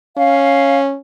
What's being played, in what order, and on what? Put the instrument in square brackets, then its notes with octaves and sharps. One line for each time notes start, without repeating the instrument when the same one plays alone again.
[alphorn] C#4 [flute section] F5